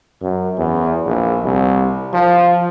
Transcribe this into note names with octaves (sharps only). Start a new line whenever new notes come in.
F#2
E2
A#1
C2
F3